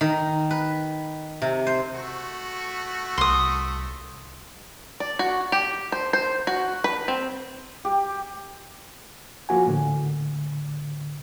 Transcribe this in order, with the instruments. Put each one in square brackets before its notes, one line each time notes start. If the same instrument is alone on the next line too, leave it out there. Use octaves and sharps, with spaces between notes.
[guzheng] D#3
B4
C3
C5
[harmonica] A3 F#4
[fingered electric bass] C2 [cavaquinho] C6 D#6
[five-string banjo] D5
F#4
G4
C5
C5
F#4
B4
C4
[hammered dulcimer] G4
[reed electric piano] F3 A#3 F#4 G#5
A2 D3